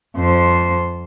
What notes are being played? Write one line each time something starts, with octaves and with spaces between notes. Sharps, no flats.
F2 C5